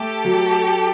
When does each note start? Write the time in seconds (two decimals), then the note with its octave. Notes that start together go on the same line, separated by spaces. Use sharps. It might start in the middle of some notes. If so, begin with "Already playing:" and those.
Already playing: A3 G4 A4
0.25 F#3